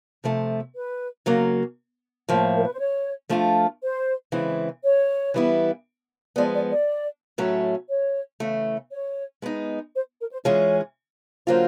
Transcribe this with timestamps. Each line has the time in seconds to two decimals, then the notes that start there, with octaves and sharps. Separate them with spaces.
0.24 C3 F3 A3
0.75 B4
1.26 C#3 F#3 A#3
2.29 A2 F3 A#3
2.55 A#4
2.64 B4
2.71 C5
2.79 C#5
3.29 F3 A3 D4 F4 A4
3.82 C5
4.32 C#3 E3 G#3 C4 E4
4.83 C#5
5.34 E3 G3 B3 E4
6.36 F3 G#3 B3 D5
6.53 D5
6.70 D5
7.38 A2 F#3 A3 C#4
7.89 C#5
8.40 C#3 E3 A3
8.92 C#5
9.42 G#3 B3 D#4
9.94 C5
10.20 A#4
10.31 C5
10.44 E3 G#3 C#4 F4 G#4 C#5
11.47 D3 F#3 A#3 C#4 F4 C5